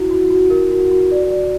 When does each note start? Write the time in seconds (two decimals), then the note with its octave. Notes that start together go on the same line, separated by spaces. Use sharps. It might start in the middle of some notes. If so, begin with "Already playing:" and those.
Already playing: E4 F#4
0.11 F#4
0.30 F#4
0.50 A#4
0.71 F#4
0.91 F#4
1.11 D5
1.32 D5